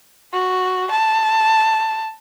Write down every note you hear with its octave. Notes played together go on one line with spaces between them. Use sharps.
F#4
A5